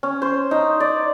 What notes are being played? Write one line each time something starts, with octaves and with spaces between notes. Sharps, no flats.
C#4
C5
D#4
D5